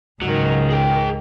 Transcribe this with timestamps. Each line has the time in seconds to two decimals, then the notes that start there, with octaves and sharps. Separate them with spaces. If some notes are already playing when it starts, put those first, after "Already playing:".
0.22 C#2 G#2 D#3 F#3
0.70 G#4 G5